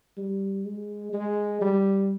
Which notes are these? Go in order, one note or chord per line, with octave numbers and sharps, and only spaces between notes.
G3
G#3
G#3
G3